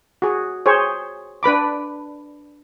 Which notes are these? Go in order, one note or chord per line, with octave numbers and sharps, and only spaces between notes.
F#4 G#4
G#4 C5 C#5
D4 B4 B5 D6